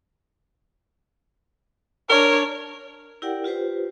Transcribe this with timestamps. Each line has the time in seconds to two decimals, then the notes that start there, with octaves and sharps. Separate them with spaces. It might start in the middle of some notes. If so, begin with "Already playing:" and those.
2.10 D4 A#4 C#5
3.22 E4 G4 A#4 D5 F#5 G5
3.44 F4 G4 B4 C5